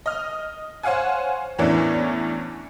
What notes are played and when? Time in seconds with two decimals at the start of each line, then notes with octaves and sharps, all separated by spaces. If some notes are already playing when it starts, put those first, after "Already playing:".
0.06 D#5 F6
0.83 C5 C#5 F5 F#5 G#5
1.58 E2 A2 E3 C#4 D4